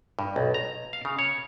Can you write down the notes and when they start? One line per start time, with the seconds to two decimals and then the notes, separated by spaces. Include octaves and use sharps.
0.19 G2
0.36 B1
0.54 A#5
0.93 F5
1.05 C#3
1.19 C#5